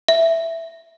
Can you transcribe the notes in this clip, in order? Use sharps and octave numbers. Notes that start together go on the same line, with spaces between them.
E5